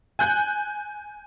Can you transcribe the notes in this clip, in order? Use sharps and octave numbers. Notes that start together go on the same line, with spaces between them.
G#5 F#6 G6